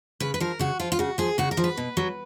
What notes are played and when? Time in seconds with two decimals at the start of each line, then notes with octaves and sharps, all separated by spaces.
0.20 C#3 B4
0.34 B4
0.40 F3 A#4
0.59 C#3 F#4
0.80 F3 F4
0.92 F4
0.99 C#3 F#4
1.18 F3 G#4
1.38 C#3 F#4
1.51 A#4
1.57 F3
1.64 B4
1.77 B2
1.97 F#3